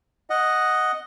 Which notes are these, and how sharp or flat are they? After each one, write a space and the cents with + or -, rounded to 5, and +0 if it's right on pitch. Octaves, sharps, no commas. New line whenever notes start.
D#5 +0 F#5 +0